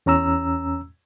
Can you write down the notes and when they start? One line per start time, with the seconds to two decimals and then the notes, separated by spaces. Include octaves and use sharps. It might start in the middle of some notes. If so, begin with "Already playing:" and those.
0.06 E2 C#4 A#5 E6